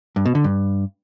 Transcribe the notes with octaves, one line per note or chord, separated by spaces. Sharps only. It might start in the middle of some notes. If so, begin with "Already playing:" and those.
G2
B2
D3
G2